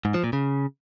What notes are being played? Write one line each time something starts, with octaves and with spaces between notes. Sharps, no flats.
G#2
F3
A#2
C#3